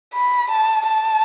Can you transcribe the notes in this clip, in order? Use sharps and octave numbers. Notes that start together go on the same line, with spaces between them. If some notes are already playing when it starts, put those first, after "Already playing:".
B5
A5
A5